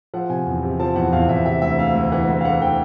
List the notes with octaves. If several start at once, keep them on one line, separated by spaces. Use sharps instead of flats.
F3 F#5
C3 G#5
E2
C3
F3 A5
E2 F#5
E2 F5
E2 E5
C3 E5
D2 E5
D2 F5
D2
E3 F#5
D2
F5
D2 F#5
E3 G5